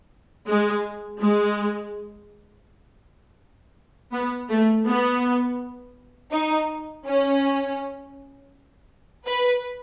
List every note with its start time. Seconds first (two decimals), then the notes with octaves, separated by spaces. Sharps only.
0.47 G#3
1.20 G#3
4.13 B3
4.49 A3
4.87 B3
6.32 D#4
7.06 C#4
9.26 B4